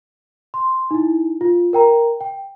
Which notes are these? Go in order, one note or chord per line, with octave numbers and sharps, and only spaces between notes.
C6
D#4 E4
F4
A#4 G5 A#5
G5